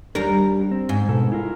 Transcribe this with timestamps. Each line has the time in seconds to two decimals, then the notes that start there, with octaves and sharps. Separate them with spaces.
0.15 D#2 G3 D4 A#4
0.71 C4
0.89 G#2
1.08 B2 A4
1.32 E4 F4 A#4